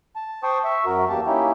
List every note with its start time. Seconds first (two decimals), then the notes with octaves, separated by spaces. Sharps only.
0.16 A5
0.43 C5 G5 A5 C6 C#6 D#6
0.64 E5 C#6
0.85 F#2 F#4 A#4
1.09 E2 A#3 G4 A5
1.27 A#3 C#4 D#4 E4 G4